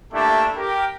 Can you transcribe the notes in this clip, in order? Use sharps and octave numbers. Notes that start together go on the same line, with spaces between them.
A3 A#3 D4 E4 G4 A4
G4 A#4